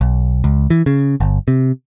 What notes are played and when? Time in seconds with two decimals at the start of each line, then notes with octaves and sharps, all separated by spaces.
0.01 B1
0.44 C#2
0.70 E3
0.86 C#3
1.20 G1
1.48 C3